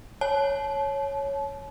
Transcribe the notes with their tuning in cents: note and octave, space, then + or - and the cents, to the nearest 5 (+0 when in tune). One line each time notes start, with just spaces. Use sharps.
C#5 +0 A5 -35